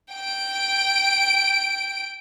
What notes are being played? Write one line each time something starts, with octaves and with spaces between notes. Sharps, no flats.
G5 D7